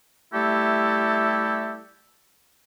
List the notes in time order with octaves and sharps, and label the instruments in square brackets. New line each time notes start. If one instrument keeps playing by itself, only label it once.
[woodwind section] G3 A3 E4 G4 A4